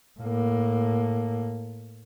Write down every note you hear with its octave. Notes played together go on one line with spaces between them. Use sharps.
A2 A#3